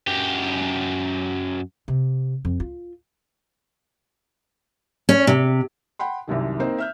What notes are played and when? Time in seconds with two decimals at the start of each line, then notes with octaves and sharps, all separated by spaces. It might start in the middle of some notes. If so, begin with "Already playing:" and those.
0.07 F#2 G4
1.88 C3
2.45 F2
2.60 F4
5.09 C#4
5.27 C3
5.99 F#5 G5 B5 C6
6.28 C2 F#2 C3 D#3
6.60 A#3 C4 D#4 C5
6.78 E5 F6 G6